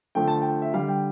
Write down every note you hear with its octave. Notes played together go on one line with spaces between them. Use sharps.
D3 F3 A3 G5
A5
G5
E5
D3 G3 F5
G5